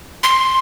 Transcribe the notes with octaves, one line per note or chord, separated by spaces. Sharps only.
C6